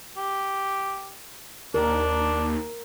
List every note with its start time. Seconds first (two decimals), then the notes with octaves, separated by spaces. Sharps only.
0.17 G4
1.74 D#2 D4 A#4